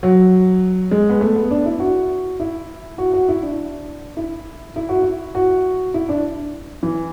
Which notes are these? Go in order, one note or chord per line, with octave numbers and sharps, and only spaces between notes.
F#3
G#3
B3
A3
B3
D4
E4
F#4
E4
F#4
F#4
E4
D4
E4
E4
F#4
E4
F#4
E4
D4
E3